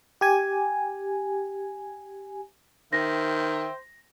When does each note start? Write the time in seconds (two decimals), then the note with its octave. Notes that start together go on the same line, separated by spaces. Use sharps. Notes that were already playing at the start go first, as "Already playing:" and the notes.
0.21 G4 G#5
2.93 D#3 C5 E5 G5 A#6